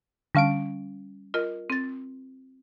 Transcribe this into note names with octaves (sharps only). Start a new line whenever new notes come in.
D3 G3 C#4 F5 A5 D7
F4 A#4 D#5
C4 A6